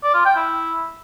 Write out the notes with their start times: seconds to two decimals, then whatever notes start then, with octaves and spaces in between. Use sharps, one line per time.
0.03 D5
0.14 F4
0.25 G5
0.36 E4